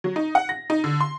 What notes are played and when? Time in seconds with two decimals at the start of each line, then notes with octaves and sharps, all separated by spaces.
0.04 F#3
0.16 D#4
0.35 F#5
0.49 A#6
0.70 D#4
0.84 D3
1.01 C6